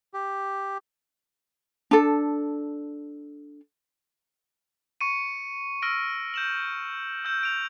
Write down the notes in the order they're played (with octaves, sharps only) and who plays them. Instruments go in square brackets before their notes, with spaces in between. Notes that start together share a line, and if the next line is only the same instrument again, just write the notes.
[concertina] G4
[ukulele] D4 A4
[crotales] C#6 C#7 D#7
E6 F6 A#6 D7
G6 E7 F#7
E6 G6 E7
G6 D7 F7